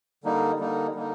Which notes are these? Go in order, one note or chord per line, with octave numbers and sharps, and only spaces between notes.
D3 G3 A#3 D#4
D3 G3 A#3 D#4
D3 G3 A#3 D#4